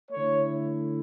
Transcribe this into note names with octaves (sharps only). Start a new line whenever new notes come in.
D3 A3 E4 C#5